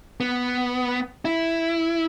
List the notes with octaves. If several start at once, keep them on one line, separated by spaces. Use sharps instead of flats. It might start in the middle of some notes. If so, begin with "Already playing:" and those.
B3
E4